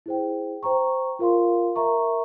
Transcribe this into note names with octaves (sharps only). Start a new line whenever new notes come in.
E4 G#4 C5 G5
C5 G5 A#5 C#6
F4 A#4 F5 C6
A#4 E5 A#5 C#6